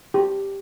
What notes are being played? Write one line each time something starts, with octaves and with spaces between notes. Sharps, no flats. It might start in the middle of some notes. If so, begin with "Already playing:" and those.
G4